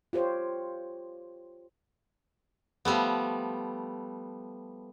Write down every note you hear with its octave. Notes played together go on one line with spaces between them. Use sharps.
F4 G4 C5 C#5
F3 G3 A3 B3